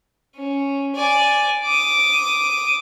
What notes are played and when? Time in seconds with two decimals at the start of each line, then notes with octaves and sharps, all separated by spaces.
0.36 C#4
0.96 D5 G#5
1.65 D6 D#6